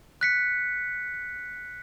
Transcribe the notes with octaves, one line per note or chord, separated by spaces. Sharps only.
F#6 B6 C#7